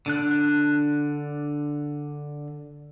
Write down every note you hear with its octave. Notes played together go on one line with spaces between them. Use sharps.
D3 D4 F#6